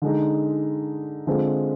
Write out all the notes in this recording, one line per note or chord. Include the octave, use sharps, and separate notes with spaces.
D3 G#3 D#4
D3 G#3 C4 F4